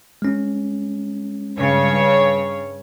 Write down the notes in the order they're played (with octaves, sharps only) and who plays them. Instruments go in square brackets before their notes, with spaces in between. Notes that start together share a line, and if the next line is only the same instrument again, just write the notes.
[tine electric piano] G#3 C#4
[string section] G2 C#3 C#5